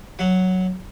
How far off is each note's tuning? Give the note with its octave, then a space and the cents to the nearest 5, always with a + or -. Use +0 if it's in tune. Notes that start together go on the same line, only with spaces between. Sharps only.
F#3 +0 F#5 +0